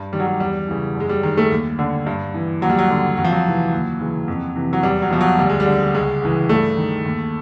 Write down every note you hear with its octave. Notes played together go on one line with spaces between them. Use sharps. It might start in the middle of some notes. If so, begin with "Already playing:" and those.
Already playing: G2
D#3 G3
F#3
G3
E2 G3
C#3 E3
F#2
G#3
G3
D#3 G#3
A3
D#2
D3
G2
E3
D#2 F#3
G3
F#3
D3
F2 F#3
F3
F#3
C3 E3
D#2
C#3 E3
F2
C3 E3
F#3
E2 G3
F#3
B2 F3
F#3
D2 G3
G#3
G3
D3
C#2 G#3
C#3 E3
G2 A3
D#3
D#2